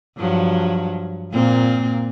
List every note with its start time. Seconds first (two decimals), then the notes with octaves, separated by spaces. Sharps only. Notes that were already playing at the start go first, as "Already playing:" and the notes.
0.18 G2 F3 F#3
1.32 A#2 A#3 C4